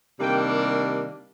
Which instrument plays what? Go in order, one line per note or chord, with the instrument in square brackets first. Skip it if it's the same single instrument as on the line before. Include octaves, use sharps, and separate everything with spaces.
[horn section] C3 D#3 G3 A#3 D4 G5